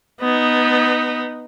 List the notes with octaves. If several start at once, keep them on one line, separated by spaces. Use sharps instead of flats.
B3 D#4